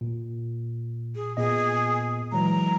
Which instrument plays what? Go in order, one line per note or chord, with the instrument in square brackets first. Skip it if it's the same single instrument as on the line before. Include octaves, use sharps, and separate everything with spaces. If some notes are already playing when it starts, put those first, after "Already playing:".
[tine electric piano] A#2
[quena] G#4
[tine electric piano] A#2 B3 D#5 [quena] G#4
[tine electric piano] E3 F#3 G#3 [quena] A#5